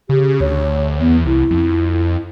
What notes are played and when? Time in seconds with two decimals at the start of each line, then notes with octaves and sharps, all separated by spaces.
0.09 C#3 G4
0.41 D2 C#5
1.00 E2 B3
1.25 C2 E4
1.51 F2